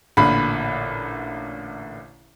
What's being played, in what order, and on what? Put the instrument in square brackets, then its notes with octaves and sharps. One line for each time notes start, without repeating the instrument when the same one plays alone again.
[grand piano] A1 A#2 D3 B5